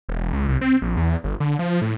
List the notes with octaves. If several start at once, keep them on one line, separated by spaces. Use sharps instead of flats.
E1
C#2
C2
C4
A#1
E2
G1
D3
F3
A2